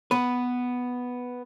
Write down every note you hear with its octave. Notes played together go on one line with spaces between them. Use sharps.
B3 B4